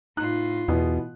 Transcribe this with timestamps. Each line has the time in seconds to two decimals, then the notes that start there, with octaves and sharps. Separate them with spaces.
0.17 A2 D#4 F4 F#6
0.68 E2 B2 E3 B3